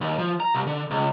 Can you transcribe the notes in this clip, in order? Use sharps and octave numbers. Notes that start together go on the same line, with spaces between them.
D#2
F3
A#5
C2
D3
C#2